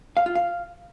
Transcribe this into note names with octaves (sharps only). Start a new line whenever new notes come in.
F5
F4
F5